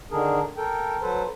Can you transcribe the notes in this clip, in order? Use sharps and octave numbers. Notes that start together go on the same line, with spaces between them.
D3 D#3 D4 G#4 A#4
A4 A#4 G5
F#3 A4 B4 C5